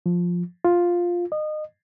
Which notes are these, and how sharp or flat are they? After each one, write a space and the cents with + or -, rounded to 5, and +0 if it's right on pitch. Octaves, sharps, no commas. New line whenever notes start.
F3 +10
F4 +5
D#5 -25